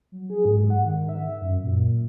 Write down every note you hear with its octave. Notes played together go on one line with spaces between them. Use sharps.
F#3
G#4
G#2
F#5
D#3
E5
F#2
A#2